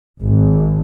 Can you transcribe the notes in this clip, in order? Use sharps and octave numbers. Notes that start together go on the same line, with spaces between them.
G#1